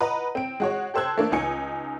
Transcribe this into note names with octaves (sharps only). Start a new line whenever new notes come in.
B4 D#5 F#5 A#5
C4 D7
G#3 F#4 C#5
G4 A4 C5 E6 F#6 G#6
A3 A#3 D4
C#2 D#4 G#5 C#7